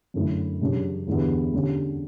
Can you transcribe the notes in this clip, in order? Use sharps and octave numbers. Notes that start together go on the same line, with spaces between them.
F#2 D3 A3 E4
F#2 C#3 G3 D4
E2 D3 G3 B3 E4
D3 G3 C#4